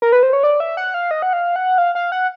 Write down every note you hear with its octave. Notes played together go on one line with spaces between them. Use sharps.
A#4
B4
C5
C#5
D5
E5
F#5
F5
D#5
F#5
F5
F#5
F5
F5
F#5